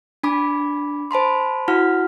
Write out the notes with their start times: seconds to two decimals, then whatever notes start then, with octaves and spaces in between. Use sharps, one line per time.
0.23 D4 G#5 B5 D6
1.11 C5 A5 B5 C6
1.68 E4 F#4 F#5 F6